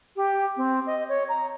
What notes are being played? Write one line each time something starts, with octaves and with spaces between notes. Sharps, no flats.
G4
C4
D#5
C#5
A#5